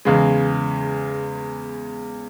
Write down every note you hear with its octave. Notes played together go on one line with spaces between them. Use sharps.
E2 C#3 G#3